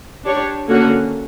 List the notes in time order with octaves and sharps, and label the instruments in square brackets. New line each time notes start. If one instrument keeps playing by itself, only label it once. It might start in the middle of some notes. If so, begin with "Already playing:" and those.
[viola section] D4 G4 C#5
D3 A#3 C#4 F#4